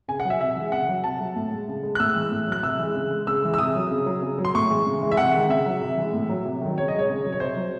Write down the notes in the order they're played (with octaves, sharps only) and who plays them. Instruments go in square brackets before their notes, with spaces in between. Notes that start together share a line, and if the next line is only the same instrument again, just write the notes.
[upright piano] C#3 G#5
F#5
F#3
E5
C3 E5
E3 G#3
C#3 F#5
F#3
C3 A5
F#3
A2
G#3
C#3
G#3
F#6
A2 E6
E3 G#3
A2
F#3 F#6
C3 E6
E3 G#3
C#3
G#3
C#3 E6
E3 G#3
E6
C3 D#6
F#3
C#3
F#3
C#3
F#3
C6
A2 C#6
E3 G#3
C#3
E3 G#3
E5
C3 F#5
D#3 G#3
C#3 E5
F#3
C3
E3 G#3
A2
F#3
C3
D#3 F#3
C#3 C#5
D#5
G#3
C#5
C#3
F#3
C#5
C3 C5
F#3